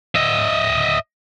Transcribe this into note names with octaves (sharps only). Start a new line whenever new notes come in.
D#5 E5